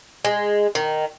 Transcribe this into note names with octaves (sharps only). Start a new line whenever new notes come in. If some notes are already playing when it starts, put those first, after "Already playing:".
G#3
D#3